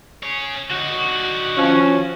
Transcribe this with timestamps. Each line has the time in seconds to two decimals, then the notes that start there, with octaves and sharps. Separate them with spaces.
0.23 G#4 C#5
0.71 D3 D#4 F#4
1.57 F3 C#4